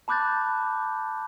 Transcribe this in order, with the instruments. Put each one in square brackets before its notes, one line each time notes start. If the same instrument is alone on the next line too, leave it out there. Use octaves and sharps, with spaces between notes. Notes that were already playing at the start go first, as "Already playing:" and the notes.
[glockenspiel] A5 B5 D6 F#6 G6 A6